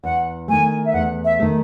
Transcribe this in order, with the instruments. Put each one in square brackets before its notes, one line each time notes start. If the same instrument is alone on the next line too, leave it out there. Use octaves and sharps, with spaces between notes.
[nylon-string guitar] E2 [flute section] F#5
[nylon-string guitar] D#3 A3 [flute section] G#5
[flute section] E5
[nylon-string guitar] E2 [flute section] F#5
[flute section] E5
[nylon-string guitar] D#3 A3